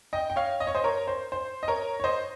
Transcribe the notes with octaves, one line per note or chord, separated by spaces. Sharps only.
D#5 G5
G5
C#5 F5
D#5
C#5
C5 D#5
A#4 C#5
C5
C5
D#5
A#4 C#5
C#5
C5 D#5